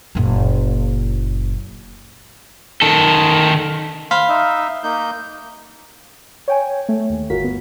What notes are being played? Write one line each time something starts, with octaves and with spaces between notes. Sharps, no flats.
F#1 A#2
D#3 A4
C5 F5 B5
D#4 E5
A#3 D#4 G6
C#5 G5 G#5
A3
D#2
G1 F4 F#4 A#4 B6
B3